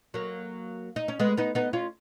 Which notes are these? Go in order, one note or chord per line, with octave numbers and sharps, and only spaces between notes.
F#3 A#3
D#4
C#4
G#3 B3
B3 D#4
B3 D#4
C#4 F4